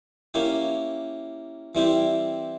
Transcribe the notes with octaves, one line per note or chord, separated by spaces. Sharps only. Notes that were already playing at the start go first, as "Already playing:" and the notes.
A#3 C#4 E4 G4
E3 G3 C4 E4 G4